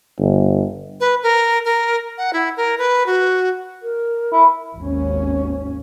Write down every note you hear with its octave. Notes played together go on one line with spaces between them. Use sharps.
G1
B4
A#4
A#4
F#5
E4
A#4
B4
F#4
A#4
E4
G#1 D#2 C#4